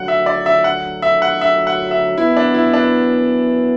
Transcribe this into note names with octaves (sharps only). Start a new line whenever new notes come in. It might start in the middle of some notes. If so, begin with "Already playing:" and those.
Already playing: D2 D3 F#3 F#5
E5
D5
E5
F#5
E5
F#5
E5
F#5
E5
F#2 E3 B3 E4
D4
E4
D4